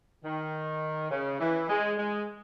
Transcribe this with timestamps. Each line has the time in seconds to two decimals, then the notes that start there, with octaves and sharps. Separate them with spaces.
0.24 D#3
1.11 C#3
1.40 E3
1.69 G#3
1.98 G#3